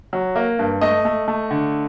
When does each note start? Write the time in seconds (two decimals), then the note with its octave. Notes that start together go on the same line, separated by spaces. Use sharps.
0.13 F#3
0.36 A#3
0.59 G2
0.81 A3 D#5
1.05 A3
1.28 A3
1.51 D3